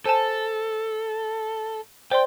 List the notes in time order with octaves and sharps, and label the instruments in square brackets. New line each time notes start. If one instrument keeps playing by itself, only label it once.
[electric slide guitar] A4 [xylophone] C5 G#5 A5
[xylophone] C5 D5 C6 [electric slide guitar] G5